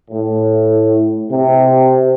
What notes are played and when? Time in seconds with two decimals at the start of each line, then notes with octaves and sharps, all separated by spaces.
0.11 A2
1.31 C3